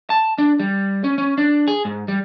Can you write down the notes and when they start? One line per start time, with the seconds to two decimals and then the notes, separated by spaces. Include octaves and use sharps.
0.10 A5
0.38 D4
0.60 G3
1.04 C#4
1.18 C#4
1.38 D4
1.68 G#4
1.85 G#2
2.08 G3